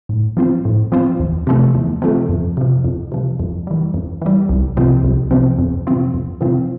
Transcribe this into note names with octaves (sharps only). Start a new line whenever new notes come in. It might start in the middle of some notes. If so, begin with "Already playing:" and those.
A2
F3 C4 F4 C5
A2
F3 C4 F4 C5
E2
C3 F3 A3
E2
C3 F3 A3
F2
C3 F3
F2
C3 F3
F2
E3 G3
F2
E3 G3
C2
C3 F3 C4
C2
C3 F3 C4
F2
C3 F3 C4 F4
F2
C3 F3 C4 F4